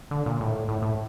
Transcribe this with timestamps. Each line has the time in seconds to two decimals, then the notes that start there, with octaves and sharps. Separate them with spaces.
0.11 D3
0.26 A#2
0.41 A2
0.68 A2
0.82 A2